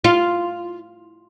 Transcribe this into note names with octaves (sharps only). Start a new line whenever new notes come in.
F4